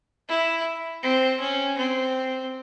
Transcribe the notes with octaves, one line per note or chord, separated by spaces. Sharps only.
E4
C4
C#4
C4